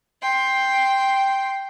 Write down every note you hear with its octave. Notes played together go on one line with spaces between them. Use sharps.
G5 C6